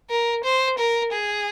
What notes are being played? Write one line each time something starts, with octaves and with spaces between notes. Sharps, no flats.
A#4
C5
A#4
G#4